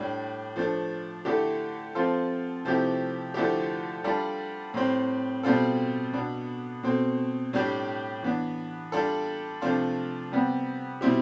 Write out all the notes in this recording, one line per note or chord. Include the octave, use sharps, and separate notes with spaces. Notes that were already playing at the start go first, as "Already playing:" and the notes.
Already playing: A2 G3 D4
F3 A3 D4
D3 A3 E4 G4
F3 C4 F4 A4
C3 F3 A3 E4 G4
D3 F3 A3 E4 G4
G3 D4 F4 A4
A2 G3 C4
B2 G3 C4 F4 A4
B2 B3 D4
B2 A3 C4
A2 G3 D4 G4
E3 B3 D4
G3 D4 F4 A4
C3 F3 A3 D4 F4
C3 G3 B3
B2 G3 C4 E4 G4